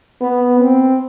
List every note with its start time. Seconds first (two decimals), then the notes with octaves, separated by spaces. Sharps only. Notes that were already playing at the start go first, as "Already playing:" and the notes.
0.21 B3
0.60 C4